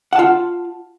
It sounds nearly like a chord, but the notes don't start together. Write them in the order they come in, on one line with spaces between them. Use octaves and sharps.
F#5 A5 F4